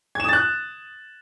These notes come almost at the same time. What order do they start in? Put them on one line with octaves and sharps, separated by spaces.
G#6 E7 D#6 A6 F#6